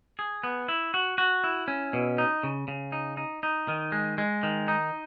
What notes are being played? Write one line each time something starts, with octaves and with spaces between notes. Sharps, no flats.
G#4
B3
E4
F#4
F#4
E4
C#4
B2
D#4
C#3
C#3
D#4
D#4
D#4
D#3
G#3
G#3
D#3
D#4